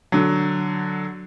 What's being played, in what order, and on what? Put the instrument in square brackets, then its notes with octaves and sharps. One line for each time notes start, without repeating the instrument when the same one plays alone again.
[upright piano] D3 F#3